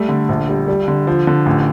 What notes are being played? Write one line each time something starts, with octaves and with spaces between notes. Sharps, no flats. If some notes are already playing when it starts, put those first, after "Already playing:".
Already playing: G3 A3
D3
A#1
G3
G3
D3
F3
D3
A1